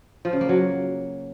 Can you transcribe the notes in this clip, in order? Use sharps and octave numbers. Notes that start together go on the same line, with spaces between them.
F3
C#3
A#3
F#3